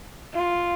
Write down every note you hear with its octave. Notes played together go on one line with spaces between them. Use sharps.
F4